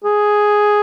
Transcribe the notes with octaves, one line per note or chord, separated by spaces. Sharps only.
G#4